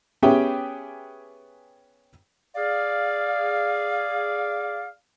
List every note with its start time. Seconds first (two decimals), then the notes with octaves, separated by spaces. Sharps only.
0.22 B3 C#4 G4 G#4 E5 G5
2.56 G#4 D5 F5